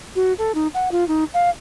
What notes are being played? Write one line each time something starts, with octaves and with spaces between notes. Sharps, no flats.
F#4
A4
D#4
F#5
F4
D#4
F5